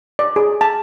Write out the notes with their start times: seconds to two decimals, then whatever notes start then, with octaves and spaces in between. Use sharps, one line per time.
0.19 D5
0.36 G#4
0.61 A5